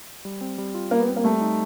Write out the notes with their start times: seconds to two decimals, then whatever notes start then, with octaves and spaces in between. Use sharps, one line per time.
0.25 G3
0.41 C4
0.58 G3
0.75 F4
0.91 G3 A#3
1.00 B3
1.08 C4
1.16 A#3
1.24 G3 A3
1.41 D#4